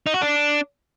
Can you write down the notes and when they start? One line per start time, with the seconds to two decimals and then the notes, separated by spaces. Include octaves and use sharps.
0.06 D#4
0.14 F#4
0.22 D4